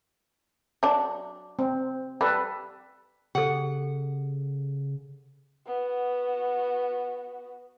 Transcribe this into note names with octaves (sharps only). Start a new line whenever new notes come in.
F#3 D4
C4
G3 A4 B4
C#3 G4 A4 F#5
B3 F#4